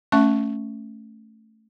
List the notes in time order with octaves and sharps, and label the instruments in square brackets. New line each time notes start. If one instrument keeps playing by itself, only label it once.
[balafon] A3 C#4 E5 C#6